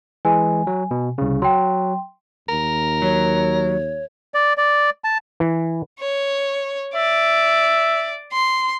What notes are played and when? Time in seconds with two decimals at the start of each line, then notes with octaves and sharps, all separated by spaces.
0.25 E3 G#3 G#5
0.67 F#3
0.91 B2
1.18 C2 C#3
1.42 F#3 G5 C6
2.49 D#2 A#4
3.02 F#3 C#5
4.34 D5
4.57 D5
5.04 A5
5.40 E3
6.00 C#5
6.95 D5 E5
8.33 C6